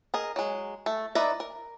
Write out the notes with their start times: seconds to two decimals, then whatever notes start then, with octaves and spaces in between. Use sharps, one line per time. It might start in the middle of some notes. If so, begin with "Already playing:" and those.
0.14 G#4 A#4 D#5
0.36 F#3 G#3
0.86 A3
1.15 D#4 B4 D5 E5 A#5
1.40 A#4